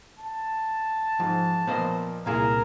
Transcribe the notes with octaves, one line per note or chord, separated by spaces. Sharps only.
A5
G#2 F3
A#2 F3 B3 C5 D#5
C2 A#2 E4 G#4 A#4 F5 G#5